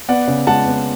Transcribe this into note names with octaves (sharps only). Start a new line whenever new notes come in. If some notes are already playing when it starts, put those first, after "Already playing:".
B3 D5 F#5
C#3
G#3 F#5 A5
B3